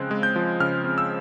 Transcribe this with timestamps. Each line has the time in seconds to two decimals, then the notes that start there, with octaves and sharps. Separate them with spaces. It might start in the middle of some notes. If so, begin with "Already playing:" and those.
Already playing: C#3 F3 G#3 C4 F#6
0.11 G#3
0.23 G6
0.36 F3
0.60 C#3 F6
0.84 C4
0.98 E6